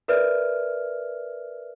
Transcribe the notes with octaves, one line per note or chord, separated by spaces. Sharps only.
A#4 B4 D5 E5 F6